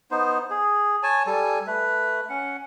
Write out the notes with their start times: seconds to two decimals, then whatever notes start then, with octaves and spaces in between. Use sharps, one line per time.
0.11 B3 D#4 C5
0.51 G#4
1.03 C#5 G#5 A5
1.27 G3 A4 G#5
1.67 A3 B4
2.30 C#4 F#5